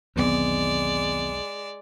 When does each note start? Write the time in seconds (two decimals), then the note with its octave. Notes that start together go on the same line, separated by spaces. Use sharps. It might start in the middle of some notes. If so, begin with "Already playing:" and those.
0.16 B1 E2 D#3 G#3 B3 C4 D5